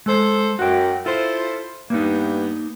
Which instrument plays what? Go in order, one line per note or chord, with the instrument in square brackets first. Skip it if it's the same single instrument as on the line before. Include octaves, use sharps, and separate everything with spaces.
[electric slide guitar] G#3 [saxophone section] A4 C5
[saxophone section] F#2 [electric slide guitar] F#4 G5
[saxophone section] E4 A4 C5 [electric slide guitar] F4
[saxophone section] G2 B3 [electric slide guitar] A#3 D#4